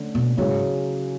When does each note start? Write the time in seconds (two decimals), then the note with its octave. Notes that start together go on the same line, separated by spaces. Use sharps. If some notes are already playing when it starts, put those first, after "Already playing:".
Already playing: D3 A3 C#4
0.15 B2
0.37 G#2 C#3 F#3 C#4 E4 G#4